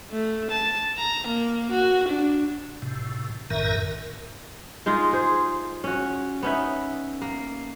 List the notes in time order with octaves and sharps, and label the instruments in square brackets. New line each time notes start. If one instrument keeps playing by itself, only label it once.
[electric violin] A3
A5
A#5
A#3
F#4
D4
[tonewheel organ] A2 C3
A#1 F#2 A2 D#3 A#4 E5
[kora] G#3 D#4 F4
G#4 C5
C#4 F#4
B3 C#4 D#4 E5
A#3